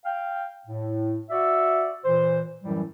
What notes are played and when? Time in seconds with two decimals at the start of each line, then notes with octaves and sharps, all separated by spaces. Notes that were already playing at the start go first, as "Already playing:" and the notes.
0.04 F5 G5
0.66 A2
1.29 F#4 D5 E5
2.04 A#2 E3 C5
2.63 F#2 A2 E3 F#3 G3